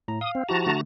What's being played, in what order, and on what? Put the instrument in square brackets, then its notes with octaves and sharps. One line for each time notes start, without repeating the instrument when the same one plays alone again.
[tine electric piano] A2 A#5
[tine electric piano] F5 [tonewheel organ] D#6
[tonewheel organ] C4
[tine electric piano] F3 E4 G4 [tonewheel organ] F#4 A5 A#5
[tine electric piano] D3 A3